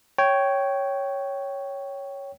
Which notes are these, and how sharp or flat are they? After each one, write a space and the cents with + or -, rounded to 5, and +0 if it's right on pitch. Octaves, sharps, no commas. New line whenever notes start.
C#5 +0 G5 -10